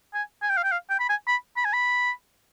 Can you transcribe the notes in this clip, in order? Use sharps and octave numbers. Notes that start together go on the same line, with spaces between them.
G#5
G#5
G5
F5
G5
F5
G5
B5
G#5
B5
B5
G#5
B5